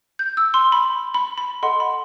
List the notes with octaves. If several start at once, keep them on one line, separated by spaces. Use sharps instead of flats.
G6
E6
C6
B5
B5
B5
A4 D#5 F#5 C6
B5